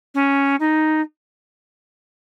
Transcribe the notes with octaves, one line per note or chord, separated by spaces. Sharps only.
C#4
D#4